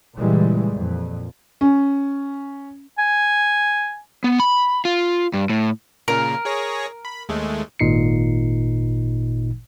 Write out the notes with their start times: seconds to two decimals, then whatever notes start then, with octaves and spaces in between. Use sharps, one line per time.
0.17 A#2 C#3 E3 G3 G#3
0.73 F2 A#2
1.61 C#4
2.98 G#5
4.24 B3
4.40 B5
4.85 F4
5.34 G2
5.50 A2
6.08 A#2 C#3 A#4
6.45 G#4 C#5 A#6
7.05 B5
7.29 D#2 G#3 A3
7.79 G#1 A#2 D#4 C7 C#7